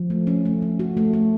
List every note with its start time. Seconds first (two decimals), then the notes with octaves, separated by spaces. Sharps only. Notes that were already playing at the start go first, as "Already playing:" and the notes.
Already playing: F3
0.10 A3
0.27 C#4
0.45 A3
0.62 C#4
0.80 F#4
0.97 A3
1.13 A3